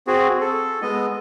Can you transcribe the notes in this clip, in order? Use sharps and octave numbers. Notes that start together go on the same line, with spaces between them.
C4 F#4 G#4
A4
G#3 B3 D#5